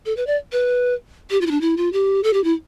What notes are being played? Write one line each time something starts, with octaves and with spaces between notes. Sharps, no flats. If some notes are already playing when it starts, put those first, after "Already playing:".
A4
B4
D5
B4
G4
F4
E4
D4
E4
F4
G4
A4
G4
E4